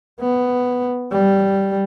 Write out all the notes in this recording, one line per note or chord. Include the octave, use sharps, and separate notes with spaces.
B3
G3